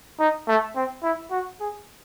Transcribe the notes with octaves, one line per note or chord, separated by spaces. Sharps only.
D#4
A3
C4
E4
F#4
G#4